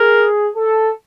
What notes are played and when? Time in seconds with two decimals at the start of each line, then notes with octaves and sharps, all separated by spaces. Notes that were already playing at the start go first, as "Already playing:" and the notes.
Already playing: G#4 A#4
0.55 A4